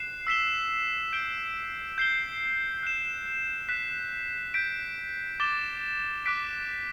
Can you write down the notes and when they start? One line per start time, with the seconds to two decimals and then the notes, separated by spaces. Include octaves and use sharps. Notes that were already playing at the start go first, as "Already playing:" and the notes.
Already playing: F#6 C7 E7
0.27 E6 B6 E7 G7
1.13 G6 D7 G7
1.98 G6 C7 G7
2.83 F#6 C7 E7
3.69 F#6 B6 E7
4.54 G6 B6 D7
5.40 D6 A6 E7 G7
6.25 D6 F#6 B6 D7